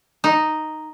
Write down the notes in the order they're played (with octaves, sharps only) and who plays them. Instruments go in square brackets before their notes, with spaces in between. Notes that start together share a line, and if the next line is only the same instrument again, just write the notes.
[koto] D#4